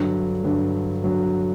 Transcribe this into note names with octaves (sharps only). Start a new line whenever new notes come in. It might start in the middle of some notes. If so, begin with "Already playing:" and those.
Already playing: G2 D3 F#3
G2 D3 F#3
D3 F#3